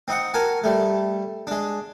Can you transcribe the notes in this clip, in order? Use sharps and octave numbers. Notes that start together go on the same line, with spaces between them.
C4 D#4 F#5
F#4 A#4 G#5 A5
G3 A3
G#3 D4